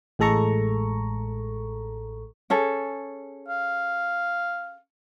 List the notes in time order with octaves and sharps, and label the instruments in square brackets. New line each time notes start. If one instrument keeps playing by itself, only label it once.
[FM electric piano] A1 A2 G#3 A4 A#5 C#6
[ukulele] C#4 G#4 A4
[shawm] F5